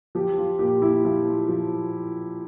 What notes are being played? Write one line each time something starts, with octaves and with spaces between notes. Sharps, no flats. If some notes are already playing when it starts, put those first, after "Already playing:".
F3 G4
F4
A#2 G4
E4
F3 F4
F3